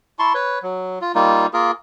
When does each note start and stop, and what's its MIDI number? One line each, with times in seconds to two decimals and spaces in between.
0.19 0.33 64
0.19 0.33 81
0.19 0.33 84
0.19 0.33 85
0.34 0.59 71
0.34 0.59 73
0.62 0.99 54
1.01 1.12 65
1.15 1.46 55
1.15 1.46 58
1.15 1.46 63
1.15 1.46 65
1.54 1.71 58
1.54 1.71 65
1.54 1.71 68
1.54 1.71 70